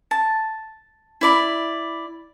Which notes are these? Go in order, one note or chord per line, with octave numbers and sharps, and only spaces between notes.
A5
E4 D5 B5